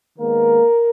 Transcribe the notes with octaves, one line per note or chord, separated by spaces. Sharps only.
D#3 G#3 A#3 B3 A#4